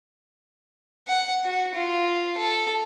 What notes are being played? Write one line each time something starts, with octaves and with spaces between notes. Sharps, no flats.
F#5
F#4
F4
A4